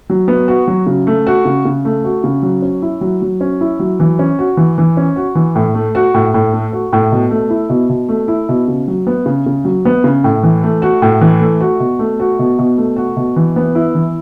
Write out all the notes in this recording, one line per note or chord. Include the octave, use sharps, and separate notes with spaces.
F#3
B3
F#4
F#3
C#3
A3
F#4
C#3
C#3
A3
F#4
C#3
F#3
C#4
E4
F#3
F#3
C#4
E4
F#3
E3
C#4
F#4
E3
E3
C#4
F#4
E3
A2
A3
F#4
A2
A2
A3
F#4
A2
B2
A3
E4
B2
B2
A3
E4
B2
C#3
F#3
B3
C#3
C#3
F#3
B3
C#3
A2
E3
A3
F#4
A2
E3
A3
F#4
B2
A3
F#4
B2
B2
A3
F#4
B2
E3
B3
E4
E3